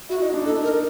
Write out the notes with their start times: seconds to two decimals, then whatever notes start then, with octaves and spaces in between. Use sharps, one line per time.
0.09 E4 F#4
0.22 D#4
0.34 D4
0.42 D#4
0.45 D4 A4
0.63 D#4 A#4